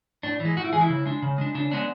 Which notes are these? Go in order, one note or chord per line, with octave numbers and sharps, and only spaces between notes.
A2 D4
E3
G#3
A2 F#4
E4
E3 G#3 G#4
E4
C#3
G#3 D4
C#3
G#3 D4
C#3 D4
G#3 B3 D4